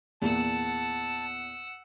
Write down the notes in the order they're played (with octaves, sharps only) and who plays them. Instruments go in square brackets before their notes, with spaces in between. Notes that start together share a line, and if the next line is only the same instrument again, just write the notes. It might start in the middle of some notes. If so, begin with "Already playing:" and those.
[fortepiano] E2 A#2 [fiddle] F#5 E6 [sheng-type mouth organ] A5